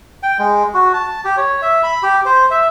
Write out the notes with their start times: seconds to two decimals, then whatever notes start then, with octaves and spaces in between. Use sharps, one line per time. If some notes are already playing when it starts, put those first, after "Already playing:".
0.23 G5
0.39 G#3
0.74 F#4
0.94 A5
1.25 G4
1.37 C#5
1.62 E5
1.83 B5
2.03 G4
2.26 C5
2.51 E5